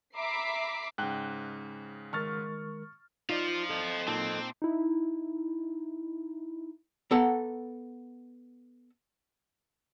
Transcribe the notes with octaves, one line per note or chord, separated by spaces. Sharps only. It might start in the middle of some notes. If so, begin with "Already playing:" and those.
E5 A#5 B5 D6 B6 C7
G#2 C#3 G5 F#6
D#3 G#3 A#4 C#6 F6 A6
D#4 F4 C5 D5 F5
A4 D#5
A#2 C4 D#4 A5
D#4 E4
B3 A4 F#5 A#5